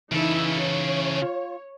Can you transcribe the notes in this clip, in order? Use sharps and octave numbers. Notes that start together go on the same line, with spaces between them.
C#3 E3 D#4 E4 A4
C#5
F4